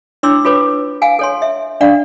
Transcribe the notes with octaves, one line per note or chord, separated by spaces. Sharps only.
D4 E4 C#5 C6 D6 E6
F4 A4 B4 C#5 D6
F5 F#5 G#5
A4 C#5 C6
E5
D4 D5 F5 F#5